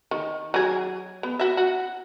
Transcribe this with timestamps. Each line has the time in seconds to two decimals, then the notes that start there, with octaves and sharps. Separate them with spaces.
0.11 D#3
0.54 F#3 G#4
1.23 B3
1.39 F#4 E5
1.57 F#4